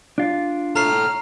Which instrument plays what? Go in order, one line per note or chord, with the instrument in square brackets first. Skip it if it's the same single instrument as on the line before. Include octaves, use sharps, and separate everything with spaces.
[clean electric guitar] D4 F4
[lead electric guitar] A4 C#5 [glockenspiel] A#5 C7 [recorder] F6